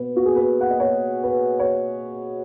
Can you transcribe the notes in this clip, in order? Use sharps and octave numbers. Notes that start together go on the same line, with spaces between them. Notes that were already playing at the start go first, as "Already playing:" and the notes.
Already playing: B2 B3 B4
F#4
G#4
B4
F#5
D#5
C#5
B4
C#5